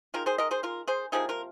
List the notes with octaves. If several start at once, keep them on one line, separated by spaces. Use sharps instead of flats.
D#3 G#3 F4 A#4
G#4 C5
A#4 D#5
G#4 C5
F4 A#4
G#4 C5
C3 F3 A#3 D#4 G#4
F4 A#4